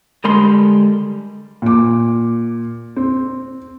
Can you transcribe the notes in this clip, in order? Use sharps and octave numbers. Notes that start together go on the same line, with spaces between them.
D3 G3 G#3 A#4 B5 C6
A#2 D6
C4